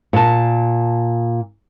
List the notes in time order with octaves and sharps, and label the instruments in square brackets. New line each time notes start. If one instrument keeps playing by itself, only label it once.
[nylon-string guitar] A#2 A5